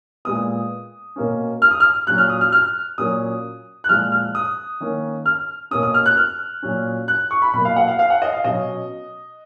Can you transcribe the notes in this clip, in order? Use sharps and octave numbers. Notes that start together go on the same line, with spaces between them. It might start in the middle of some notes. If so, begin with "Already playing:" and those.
A#2 G#3 B3 D#6
B2 A#3 C#4
F6
D#6
F6
A#2 F#3 C#4 F#6
F6
D#6
F6
F6
A#2 F#3 A#3 C#4 D#6
F#6
A#2 F3 G#3 F6
F6
D#6
D#3 A#3 C#4
F6
B2 A#3 C#4 D#6
D#6
F6
F#6
F6
A#2 F#3 C#4
F#6
C#6
B5
B2 F#3 A#3 B5
F5
F#5
F5
F5
F#5
D#5
F5
B2 F#3 C#4 D#5